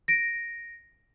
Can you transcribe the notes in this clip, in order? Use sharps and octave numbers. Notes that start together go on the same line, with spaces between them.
A#6 D7